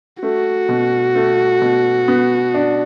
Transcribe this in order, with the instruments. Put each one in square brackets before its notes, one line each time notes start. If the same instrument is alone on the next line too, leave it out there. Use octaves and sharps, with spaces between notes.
[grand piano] A3 [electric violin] F#4
[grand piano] B2
A3
B2
B3
D4